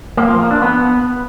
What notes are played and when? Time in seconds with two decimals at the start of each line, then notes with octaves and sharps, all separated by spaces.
0.17 A#3
0.29 F3
0.40 A#3
0.51 D4
0.62 B3